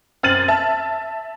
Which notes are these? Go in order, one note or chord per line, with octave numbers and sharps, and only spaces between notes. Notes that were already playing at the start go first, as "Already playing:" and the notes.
F#2 C4 F6 A6 D#7 F#7
E5 A5